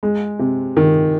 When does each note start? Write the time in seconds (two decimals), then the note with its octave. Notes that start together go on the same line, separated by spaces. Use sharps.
0.03 G#3
0.39 C3
0.77 D#3